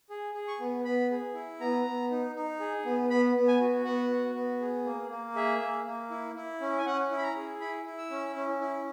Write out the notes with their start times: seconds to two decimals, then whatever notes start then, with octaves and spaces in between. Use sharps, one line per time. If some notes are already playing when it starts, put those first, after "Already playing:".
0.10 G#4
0.35 G#4
0.48 C#6
0.60 B3
0.85 B3 B5
1.11 G#4
1.35 E4
1.60 B3 A#5
1.86 B3
2.11 D#4
2.36 D#4
2.60 G#4
2.85 B3
3.10 B3 B5
3.35 B3
3.48 G#5
3.61 F#4
3.85 B3 F#5
4.10 F#4
4.35 B3
4.61 G#4
4.85 A#3
5.10 A#3
5.35 G#4 E5
5.60 A#3
5.85 A#3
6.10 E4
6.36 E4
6.61 C#4
6.78 G#5
6.85 C#4 F#5
7.11 E4
7.18 B5
7.23 A#5
7.36 G#4
7.61 E4 B5
7.86 E4
7.98 E6
8.10 C#4
8.36 C#4
8.61 E4